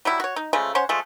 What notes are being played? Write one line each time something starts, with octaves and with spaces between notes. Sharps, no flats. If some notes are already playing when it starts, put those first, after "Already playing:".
F#3 G3 E4
F#4 C#5
D#4
C#3 F3 G#3 A3
C#4 C5 C#5 F#5
F3 G#3 A3